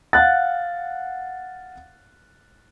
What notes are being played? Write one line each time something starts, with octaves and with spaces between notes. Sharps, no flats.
F5 F#5 F#6 A6